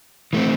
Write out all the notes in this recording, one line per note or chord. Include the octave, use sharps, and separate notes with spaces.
E3 A3 C4